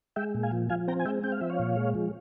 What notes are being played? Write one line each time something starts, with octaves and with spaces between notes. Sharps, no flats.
G#3 E5 G5
A#2
F5 G#5
F3
F3 F5 G#5
C4 G5 A#5
G#5
G#3 E5 G5
C4 G5
F5
F3 E5
C#5 F5
A#2
G#3
F3